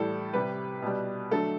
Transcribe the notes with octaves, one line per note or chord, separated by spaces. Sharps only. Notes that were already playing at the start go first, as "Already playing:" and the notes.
Already playing: A2 E3 G3 A4
C3 G3 B4
B2 G3
D3 F#3 A3 A4